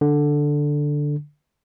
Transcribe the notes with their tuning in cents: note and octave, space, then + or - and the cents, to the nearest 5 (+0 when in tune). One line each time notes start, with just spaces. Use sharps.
D3 +0